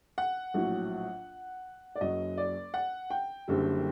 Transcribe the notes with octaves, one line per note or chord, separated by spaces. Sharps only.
F#5
A#1 A2 F#3
D5
F#1 F#2 F#3 D#5
D5
F#5
G5
F#1 F#2 D3 G3